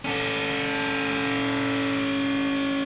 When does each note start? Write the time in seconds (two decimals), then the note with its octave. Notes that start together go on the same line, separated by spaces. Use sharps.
0.05 C#4 A4